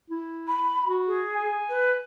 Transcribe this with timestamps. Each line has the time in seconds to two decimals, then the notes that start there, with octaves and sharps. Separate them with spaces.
0.10 E4
0.47 B5
0.86 F#4
1.07 G#4
1.35 G#5
1.69 B4